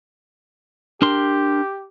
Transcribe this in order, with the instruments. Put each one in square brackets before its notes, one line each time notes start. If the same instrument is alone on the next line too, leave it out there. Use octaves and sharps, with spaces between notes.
[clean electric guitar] D4 A#4 C6 [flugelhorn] G4